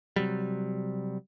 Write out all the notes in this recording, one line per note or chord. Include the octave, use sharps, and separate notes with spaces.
C3 F#3 G3